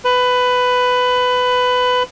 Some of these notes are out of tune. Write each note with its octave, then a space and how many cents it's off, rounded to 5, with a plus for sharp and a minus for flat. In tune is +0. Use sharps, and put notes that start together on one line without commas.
B4 +15